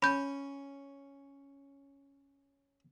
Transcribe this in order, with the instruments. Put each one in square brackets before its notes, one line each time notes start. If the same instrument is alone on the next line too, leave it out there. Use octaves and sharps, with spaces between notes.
[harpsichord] C#4 [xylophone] B5 G6